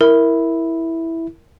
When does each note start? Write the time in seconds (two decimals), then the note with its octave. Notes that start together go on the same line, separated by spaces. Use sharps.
0.01 E4 A#4